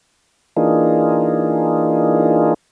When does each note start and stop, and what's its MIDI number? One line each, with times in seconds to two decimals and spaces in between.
0.57 2.54 52
0.57 2.54 58
0.57 2.54 62
0.57 2.54 63
0.57 2.54 65
0.57 2.54 68